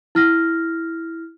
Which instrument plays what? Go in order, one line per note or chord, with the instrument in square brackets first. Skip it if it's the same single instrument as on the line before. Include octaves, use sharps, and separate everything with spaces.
[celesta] E4 F6 A#6